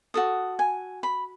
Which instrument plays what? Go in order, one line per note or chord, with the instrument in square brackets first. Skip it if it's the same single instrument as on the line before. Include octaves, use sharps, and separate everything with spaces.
[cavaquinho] F#4 A4 D#6
G#5
B5